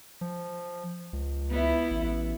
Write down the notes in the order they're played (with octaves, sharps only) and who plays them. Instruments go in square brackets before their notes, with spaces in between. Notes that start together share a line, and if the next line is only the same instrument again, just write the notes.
[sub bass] F3
C#2
[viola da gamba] B3 E4
[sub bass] A1